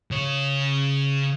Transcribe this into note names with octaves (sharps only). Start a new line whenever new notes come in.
C#3 C#5